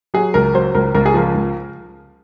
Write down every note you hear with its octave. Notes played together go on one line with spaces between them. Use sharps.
F#3 G#4
C#2 A#4
F#3 C5
C#2 A#4
C#2 A#4
G#4
F3 A#4
C#2